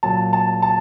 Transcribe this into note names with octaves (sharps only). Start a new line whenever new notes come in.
A#2 F#3 A5
A5
A5